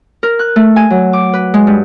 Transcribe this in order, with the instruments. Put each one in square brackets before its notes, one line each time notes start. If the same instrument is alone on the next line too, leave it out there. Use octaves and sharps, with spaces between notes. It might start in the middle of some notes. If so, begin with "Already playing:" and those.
[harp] A#4
F#6
A3
G#5
F#3
D6
B4
G#3
G2